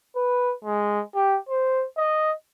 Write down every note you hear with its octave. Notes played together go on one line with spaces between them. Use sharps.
B4
G#3
G4
C5
D#5